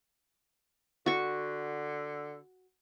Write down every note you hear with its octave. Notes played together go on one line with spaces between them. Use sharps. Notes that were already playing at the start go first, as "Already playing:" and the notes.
D3 F#4 C#6